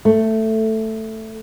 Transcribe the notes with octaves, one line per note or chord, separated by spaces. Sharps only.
A3